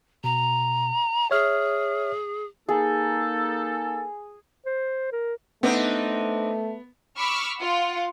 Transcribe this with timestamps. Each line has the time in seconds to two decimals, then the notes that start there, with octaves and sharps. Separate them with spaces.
0.24 B2 A#5
1.31 G#4 C#5 E5 F6
2.69 A#3 D#4 G#4 A4
4.66 C5
5.12 A#4
5.63 A3 B3 C4 D4 D#4
7.18 B5 C#6 D6 E6 F6
7.57 F4 F#5